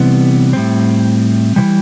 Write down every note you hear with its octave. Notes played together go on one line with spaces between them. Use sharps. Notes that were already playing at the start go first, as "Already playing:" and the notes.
Already playing: C3 E3 G3 B3
A2 G3 C4
C3 E3 G3